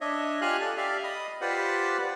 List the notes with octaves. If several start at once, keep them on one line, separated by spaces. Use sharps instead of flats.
D4 C#5 D#5 E5
F4 G4 F5 G#5 F6 F#6
A4 D5 A5
G4 D5 E5 F5 F6
D#5 B5 D#6
F4 G4 B4 C5 D5 F#5